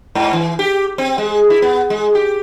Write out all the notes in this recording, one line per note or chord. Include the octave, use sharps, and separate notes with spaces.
G#2
E3
G4
C4
G#3
E4
B3
G#3
G4